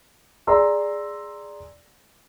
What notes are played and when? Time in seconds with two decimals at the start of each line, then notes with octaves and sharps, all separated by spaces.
0.47 G#4 D5 A#5 C6 E6